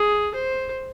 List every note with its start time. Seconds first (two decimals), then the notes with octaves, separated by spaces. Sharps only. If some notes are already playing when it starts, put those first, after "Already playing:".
Already playing: G#4
0.35 C5